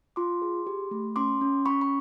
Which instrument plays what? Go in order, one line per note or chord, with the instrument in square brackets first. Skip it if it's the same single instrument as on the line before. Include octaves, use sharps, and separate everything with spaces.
[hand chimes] F4 C6 D6
G#4
G4
A3
C#4 C6 D6
C#4
C#4 B5 C#6
B5